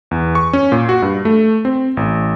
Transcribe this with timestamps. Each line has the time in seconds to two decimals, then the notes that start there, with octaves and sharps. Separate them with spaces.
0.11 E2
0.35 C#6
0.53 C#4
0.72 A#2
0.89 F#4
1.02 G2
1.25 A3
1.65 C4
1.97 A1